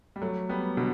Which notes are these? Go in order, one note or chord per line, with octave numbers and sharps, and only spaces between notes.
G3
F#3 A3
G3 B3
B2 D3